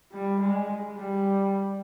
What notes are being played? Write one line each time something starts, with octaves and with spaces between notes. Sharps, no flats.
G3
G#3
G3